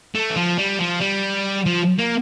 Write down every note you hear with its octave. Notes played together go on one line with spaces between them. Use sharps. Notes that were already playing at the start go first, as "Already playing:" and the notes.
A3
E3
F3
G3
F3
G3
F3
A#3